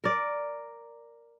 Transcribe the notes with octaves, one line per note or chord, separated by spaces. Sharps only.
A#4 D5